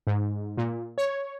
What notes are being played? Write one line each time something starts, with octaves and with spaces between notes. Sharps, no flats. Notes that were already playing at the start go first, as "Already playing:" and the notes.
G#2
A#2
C#5